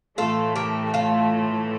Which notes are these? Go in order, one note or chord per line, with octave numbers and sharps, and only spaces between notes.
A2 E3 A3 F4 A4
G4 A#4
F4 A4